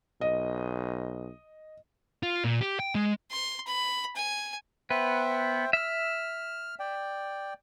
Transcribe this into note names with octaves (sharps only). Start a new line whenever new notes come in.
B1 D#5
F4
A#2
G4
G5
G#3
C6
B5
G#5
B3 B4 C5 E5 G5
E5 E6 F6
D5 G5